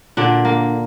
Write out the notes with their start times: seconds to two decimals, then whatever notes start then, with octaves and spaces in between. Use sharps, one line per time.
0.17 A#2 D3 D4
0.45 A#3